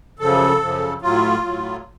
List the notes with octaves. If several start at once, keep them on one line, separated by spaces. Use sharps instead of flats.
F#2 C#3 F3 A4
F#2 C#3 F3
A2 F#3 F4
A2 F#3